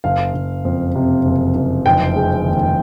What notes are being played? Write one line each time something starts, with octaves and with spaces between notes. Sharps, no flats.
F#1 F5
F#1
F2
C3
F#1
F#1
F1 G5
G#3
D#2